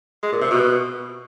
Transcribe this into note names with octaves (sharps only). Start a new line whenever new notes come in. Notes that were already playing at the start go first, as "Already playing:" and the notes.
G#3
A#2
C3
B2